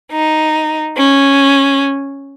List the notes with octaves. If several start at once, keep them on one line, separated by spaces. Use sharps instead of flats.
D#4
C#4